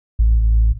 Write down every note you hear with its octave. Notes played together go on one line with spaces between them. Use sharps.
A1